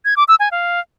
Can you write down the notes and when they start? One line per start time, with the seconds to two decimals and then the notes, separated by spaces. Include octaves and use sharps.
0.05 G#6
0.17 D6
0.28 E6
0.40 G#5
0.51 F5